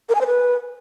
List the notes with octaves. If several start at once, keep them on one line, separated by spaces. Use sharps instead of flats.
A#4
G#5
C5
B4